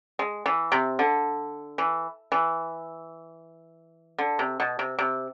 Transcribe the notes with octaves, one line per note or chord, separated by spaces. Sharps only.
G#3
E3
C3
D3
E3
E3
D3
C3
B2
C3
C3